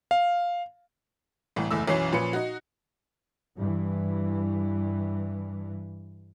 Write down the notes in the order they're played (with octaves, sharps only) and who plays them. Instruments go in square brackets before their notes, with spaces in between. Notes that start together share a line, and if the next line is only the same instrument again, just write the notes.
[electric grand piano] F5
[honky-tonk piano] C2 A2 E3
F#1 E2 A3 E6
B1 F#2 E3 C#4 C#5 C7
A#2 F3 C#4 B4 C#7
D#4 F#4
[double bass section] G2 E3